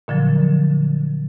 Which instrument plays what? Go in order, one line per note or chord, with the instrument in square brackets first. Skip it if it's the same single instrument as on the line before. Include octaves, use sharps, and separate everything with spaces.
[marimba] A#2 D3 F3 F#3